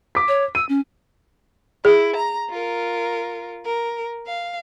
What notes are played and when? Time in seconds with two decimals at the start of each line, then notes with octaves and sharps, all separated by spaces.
0.15 D6 B6
0.28 C#5
0.55 E6 D#7
0.69 C#4
1.85 E4 G#4
2.16 A#5
2.50 F4 A#4
3.65 A#4
4.27 F5